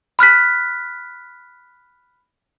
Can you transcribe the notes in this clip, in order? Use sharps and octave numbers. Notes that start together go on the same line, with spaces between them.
B5 F6 F#6 B6